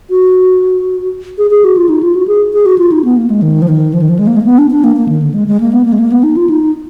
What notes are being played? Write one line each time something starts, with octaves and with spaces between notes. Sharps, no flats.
F#4
G#4
G#4
F#4
F4
D#4
F4
F#4
G#4
G#4
F#4
F4
D#4
B3
A#3
G#3
D#3
F3
D#3
F3
D#3
F3
G#3
A#3
G#3
A#3
B3
D4
D4
A#3
A#3
D#3
D3
G#3
G#3
A#3
B3
A#3
G#3
A#3
B3
D#4
F4
D#4